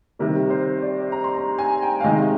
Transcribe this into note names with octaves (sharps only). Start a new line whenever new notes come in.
C3 D#3 G3 A#4
C5
D5
A#5
C6
A#5
G#5
G5
F5
C3 D#3 G#3 D#5